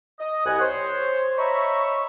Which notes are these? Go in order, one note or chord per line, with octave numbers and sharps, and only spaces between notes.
D#5
C2 B3 F#5 G#5
C5 C#5
C#5 D#5 E5 A#5 B5 C#6